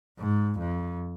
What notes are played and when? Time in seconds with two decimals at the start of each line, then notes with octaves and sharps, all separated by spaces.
0.19 G#2
0.59 F2